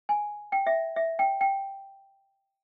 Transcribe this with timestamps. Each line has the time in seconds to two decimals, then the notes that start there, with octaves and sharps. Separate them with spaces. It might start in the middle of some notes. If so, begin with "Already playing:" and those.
0.09 G#5
0.52 G5
0.67 E5
0.96 E5
1.19 G5
1.41 G5